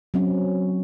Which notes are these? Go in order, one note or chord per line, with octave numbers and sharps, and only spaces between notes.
F#3 C4 C#4